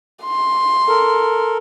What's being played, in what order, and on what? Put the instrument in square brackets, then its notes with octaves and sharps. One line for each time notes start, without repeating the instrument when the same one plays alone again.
[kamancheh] C6
[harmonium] A4 A#4